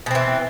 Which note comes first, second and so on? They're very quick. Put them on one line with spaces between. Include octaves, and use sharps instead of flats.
B2 C4 E3